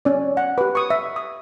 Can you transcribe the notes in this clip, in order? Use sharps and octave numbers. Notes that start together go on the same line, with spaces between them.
C#4 D5
F#5
G4 B4
C#6 D#6
E5
D#6